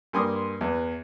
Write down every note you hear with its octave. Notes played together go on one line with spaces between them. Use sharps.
G2 A#3 G#5 C6 D6 D#6
E2 E3 B3